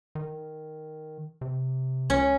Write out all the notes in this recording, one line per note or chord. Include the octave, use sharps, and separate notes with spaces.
D#3
C3
C#2 C#4